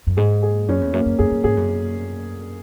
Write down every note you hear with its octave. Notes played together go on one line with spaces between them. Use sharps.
F#2
G#2 G#4
G#4
F#2 C#4
E2
F#2 A#3
F#2
F#2 G#4
F#2
G#2 G#4
F#2